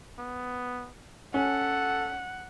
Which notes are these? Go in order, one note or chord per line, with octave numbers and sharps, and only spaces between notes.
B3
C#4 A4 F#5